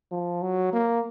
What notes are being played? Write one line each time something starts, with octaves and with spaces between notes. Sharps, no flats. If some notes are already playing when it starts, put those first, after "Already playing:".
F3
F#3
A#3